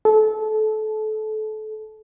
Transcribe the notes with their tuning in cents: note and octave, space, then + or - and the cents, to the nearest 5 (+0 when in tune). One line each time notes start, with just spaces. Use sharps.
A4 -25